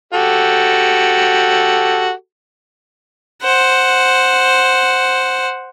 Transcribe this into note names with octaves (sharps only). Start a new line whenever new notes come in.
F#4 G4 A4
C5 F#5